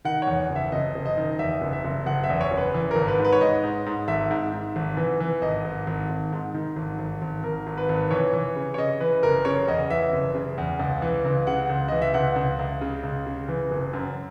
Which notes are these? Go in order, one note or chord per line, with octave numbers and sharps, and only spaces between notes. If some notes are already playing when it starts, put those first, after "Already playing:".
D#3 F#5
C#5
E2
F#1
E5
F#1 D#5
F#1
D#5
D#3
E2 E5
F#1
E5
F#1
F#1 F#5
E5
E2
C#5
F#1
B4
E3
G#1 A#4
B4
G#2
B4
C#5
G#2 D#5
G#2
G#2
G#1 E5
G#2
G#2
G#1
E3
E3
G#1 D#5
G#1
G#1
G#1
G#2
D#3
G#1
G#1
G#1
G#1 A#4
G#1
B4
G#1
E3 C#5
E3
C#3
C#5
C#3 D#5
E3 B4
F#1 A#4
C#3 C#5
E2 D#5
E3 E5
F#1
C#3
E2
C#2
E3
C#2
C#3 F#5
C#2
E3 D#5
E5
C#2 F#5
C#2
C#2
C#3
C#2
C#3
E3
F#1
F#2